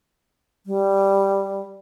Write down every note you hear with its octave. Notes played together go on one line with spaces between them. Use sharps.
G3